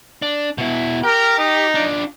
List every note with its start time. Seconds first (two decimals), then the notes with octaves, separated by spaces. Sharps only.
0.22 D4
0.58 B2 E4
1.04 G4 A#4
1.38 D#4
1.75 D4 F4